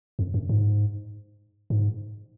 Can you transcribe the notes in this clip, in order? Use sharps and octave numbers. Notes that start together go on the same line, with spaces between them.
F2
F#2
G#2
G#2